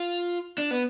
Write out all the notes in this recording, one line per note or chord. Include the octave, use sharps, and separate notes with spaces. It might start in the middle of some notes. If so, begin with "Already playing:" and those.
Already playing: F4
D4
B3